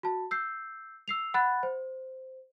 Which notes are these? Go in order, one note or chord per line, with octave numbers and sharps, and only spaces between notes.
F#4 A5
E6 G6 C7
E6 C7 F7
F#5 B5 F#6 A6
C5